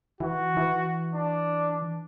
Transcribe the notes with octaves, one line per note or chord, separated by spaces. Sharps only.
E3 F#4
E3
D4